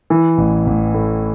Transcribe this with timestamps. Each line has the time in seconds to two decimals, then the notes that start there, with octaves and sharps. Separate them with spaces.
0.10 E3
0.38 A1
0.67 A1
0.94 A2